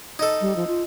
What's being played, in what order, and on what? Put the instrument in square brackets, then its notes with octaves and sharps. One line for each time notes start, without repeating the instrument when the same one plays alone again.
[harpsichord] D#4 A4
[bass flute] G3
F3
F4